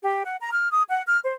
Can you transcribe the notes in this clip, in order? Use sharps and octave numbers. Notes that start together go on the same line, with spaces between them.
G4
F#5
A#5
F6
D#6
F#5
F6
C5